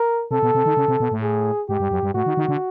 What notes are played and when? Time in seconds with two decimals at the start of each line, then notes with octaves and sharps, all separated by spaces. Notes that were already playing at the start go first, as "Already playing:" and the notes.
Already playing: A#4
0.31 C3 A4
0.43 B2
0.55 C3
0.66 D#3
0.77 C#3
0.88 C3
1.00 B2
1.11 A2
1.22 G#4
1.69 G#2 G4
1.80 G2
1.91 F#2
2.03 G2
2.14 A2 F#4
2.26 D#3
2.37 D#3
2.48 D3